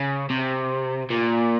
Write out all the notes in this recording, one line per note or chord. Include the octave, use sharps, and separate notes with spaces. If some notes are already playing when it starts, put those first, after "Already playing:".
Already playing: C#3
C3
A#2